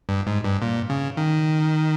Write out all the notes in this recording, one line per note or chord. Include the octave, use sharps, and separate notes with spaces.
G2
G#2
G2
A#2
C#3
D#3